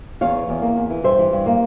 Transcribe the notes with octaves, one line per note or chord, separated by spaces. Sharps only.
E2 C#5 F5
E3
E2
A#3
E2
E3
G2 C5 E5
E3
G2
A#3